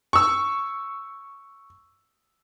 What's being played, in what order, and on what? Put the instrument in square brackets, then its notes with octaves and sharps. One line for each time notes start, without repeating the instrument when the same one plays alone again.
[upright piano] C#6 E6